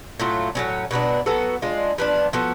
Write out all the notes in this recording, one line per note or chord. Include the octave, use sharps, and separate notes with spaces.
A2 F#3 A3 F4
A2 F#3 C#4
B2 F#3 B3 D4
F#3 B3 F#4 A4
G#3 D4 F4
F3 B3 D4
F3 B3 F#4 A4